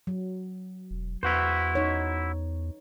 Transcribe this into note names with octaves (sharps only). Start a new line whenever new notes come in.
F#3
E1
E2 E4 F#4 B4 C5
D#4 C#5